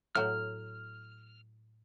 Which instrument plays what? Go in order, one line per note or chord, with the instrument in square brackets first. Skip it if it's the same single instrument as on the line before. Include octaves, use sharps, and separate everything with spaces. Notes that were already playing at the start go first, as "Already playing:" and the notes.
[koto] A2 F#3 [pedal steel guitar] F6